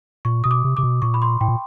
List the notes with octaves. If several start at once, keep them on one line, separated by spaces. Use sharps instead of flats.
A#2 C#6
B2 D#6
D6
C3
C3 D6
B2
A#2 C#6
B5
C6
A2 G5
A#2